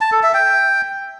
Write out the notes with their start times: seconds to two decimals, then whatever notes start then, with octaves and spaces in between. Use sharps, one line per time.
0.01 A5
0.12 A4
0.23 E5
0.34 G5